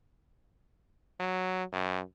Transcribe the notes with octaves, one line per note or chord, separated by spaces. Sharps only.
F#3
F#2